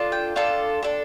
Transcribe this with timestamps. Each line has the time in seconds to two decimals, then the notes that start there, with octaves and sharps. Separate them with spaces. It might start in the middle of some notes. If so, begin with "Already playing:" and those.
Already playing: D4 F4 A4
0.12 G5
0.36 D4 F4 A4
0.83 D4 A4